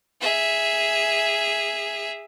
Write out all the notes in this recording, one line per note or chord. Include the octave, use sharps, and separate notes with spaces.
G#4 E5